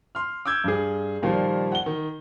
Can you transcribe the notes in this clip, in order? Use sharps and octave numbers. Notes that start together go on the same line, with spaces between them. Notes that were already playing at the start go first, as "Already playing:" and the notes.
C6 F6
D6 E6 G6 G#6
G2 G#4
A#2 D#3 F3 G3
F#5 G7
D#3